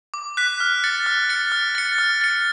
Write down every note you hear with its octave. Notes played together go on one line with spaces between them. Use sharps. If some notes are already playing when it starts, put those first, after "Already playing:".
D6
F#6 B6
F6
A6 C#7
F6
A6 C#7
F6
A6 C#7
F6
A6 C#7